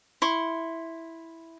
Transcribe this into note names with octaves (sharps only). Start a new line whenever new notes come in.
E4 C6 C#6